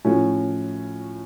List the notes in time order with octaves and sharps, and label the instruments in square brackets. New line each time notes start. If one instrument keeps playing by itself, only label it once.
[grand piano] A2 F3 A3 C#4 F#4